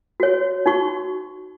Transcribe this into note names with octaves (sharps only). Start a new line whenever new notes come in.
F#4 C#5
D#4 F#4 C#6